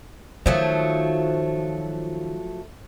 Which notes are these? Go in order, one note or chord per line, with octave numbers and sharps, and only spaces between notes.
D#3 F3 F#3 A3